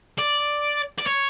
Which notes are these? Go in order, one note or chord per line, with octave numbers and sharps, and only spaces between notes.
D5
D5
C#5